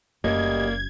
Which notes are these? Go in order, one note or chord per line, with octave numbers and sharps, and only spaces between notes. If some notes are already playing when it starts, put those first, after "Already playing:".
F#1 D2 G3 A#3 D#5 G#6